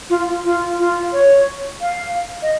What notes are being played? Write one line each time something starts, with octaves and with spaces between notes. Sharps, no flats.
F4
F4
F4
C#5
F5
D#5